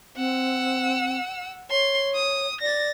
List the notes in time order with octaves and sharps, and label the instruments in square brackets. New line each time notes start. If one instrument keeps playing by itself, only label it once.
[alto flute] C4 [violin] F#5 E6
[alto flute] C#5 [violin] C6
[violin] D#6
[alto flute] D5 [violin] A6 A#6